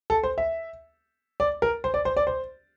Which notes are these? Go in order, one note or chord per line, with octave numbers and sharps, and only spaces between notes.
A4
C5
E5
D5
A#4
C5
D5
C5
D5
C5